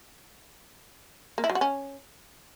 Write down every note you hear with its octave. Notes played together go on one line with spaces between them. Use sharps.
A#3
E4
F#3
F#4
C#4